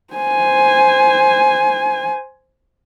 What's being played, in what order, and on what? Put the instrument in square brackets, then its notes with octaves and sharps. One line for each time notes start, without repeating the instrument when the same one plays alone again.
[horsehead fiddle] C5 G#5